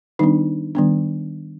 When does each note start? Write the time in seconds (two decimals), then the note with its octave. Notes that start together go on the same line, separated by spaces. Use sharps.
0.19 D#3 G3 B3 D4 D#4
0.75 D#3 G3 B3 D4